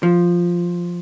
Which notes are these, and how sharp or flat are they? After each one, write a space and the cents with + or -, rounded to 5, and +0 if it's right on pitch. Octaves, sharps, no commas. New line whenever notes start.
F3 +0